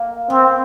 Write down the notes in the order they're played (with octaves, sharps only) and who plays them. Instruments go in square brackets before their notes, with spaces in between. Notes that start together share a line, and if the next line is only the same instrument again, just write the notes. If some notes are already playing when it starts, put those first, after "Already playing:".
Already playing: [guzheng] A#3
[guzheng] B3 [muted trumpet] C4